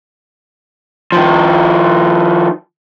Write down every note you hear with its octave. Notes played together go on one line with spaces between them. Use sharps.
D#3 F3